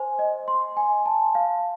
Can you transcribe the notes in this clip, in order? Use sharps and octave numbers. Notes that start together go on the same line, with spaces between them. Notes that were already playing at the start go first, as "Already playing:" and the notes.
Already playing: C5 G#5
D#5
C6
G#5
A5
F5